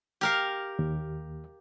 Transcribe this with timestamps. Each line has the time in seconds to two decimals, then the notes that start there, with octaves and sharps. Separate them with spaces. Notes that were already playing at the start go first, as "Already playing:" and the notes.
0.21 G4 A#4 F5
0.79 D#2